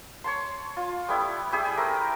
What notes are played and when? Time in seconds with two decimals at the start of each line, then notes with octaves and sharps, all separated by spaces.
0.24 C#5 A5 C6
0.77 F4
1.08 G3 A3 B3 E4
1.52 E4 G4 G#4 E5
1.77 A3 A#4 C5